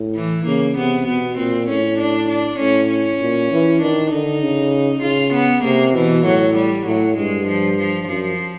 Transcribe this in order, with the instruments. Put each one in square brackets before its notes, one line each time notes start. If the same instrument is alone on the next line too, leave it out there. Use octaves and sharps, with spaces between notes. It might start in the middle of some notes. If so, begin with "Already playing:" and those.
Already playing: [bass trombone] A2
[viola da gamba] E3
[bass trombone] C#3 [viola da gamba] A#3
[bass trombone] C3 [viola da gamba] B3
[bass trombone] B2 [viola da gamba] B3
[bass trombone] A#2 [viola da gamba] C4
[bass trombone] A2 [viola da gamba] C#4
[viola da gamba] D4
D4
[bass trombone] A2 [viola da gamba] C#4
[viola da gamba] C#4
[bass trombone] A#2
E3
[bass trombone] D#3 [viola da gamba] D4
[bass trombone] D3 [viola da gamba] D#4
[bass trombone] C#3
[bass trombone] C#3 [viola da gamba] F4
[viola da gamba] B3
[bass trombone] C3 [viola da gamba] A#3
[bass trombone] B2 [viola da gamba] E3
[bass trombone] A2 [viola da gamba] F#3
[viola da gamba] G3
[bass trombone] A2 [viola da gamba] F#3
[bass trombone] G2 [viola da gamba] G#3
[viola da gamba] F3
F3
[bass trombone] F#2 [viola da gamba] F3